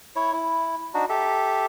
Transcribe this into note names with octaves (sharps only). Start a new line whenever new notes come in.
E4 C#5
E4
D4 D#4 F#4
G4 A4 E5